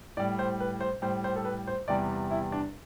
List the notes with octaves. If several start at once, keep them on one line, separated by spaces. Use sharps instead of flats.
A2 G3 D5
C5
B4
C5
A2 G3 C5
C5
A4
B4
C5
E2 C3 G3 D5
E4
D4